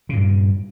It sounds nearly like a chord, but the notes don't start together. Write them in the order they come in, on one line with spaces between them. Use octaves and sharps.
C#3 A#2 G2